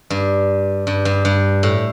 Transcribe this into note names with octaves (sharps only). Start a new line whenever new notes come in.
G2
G2
G2
G2
A2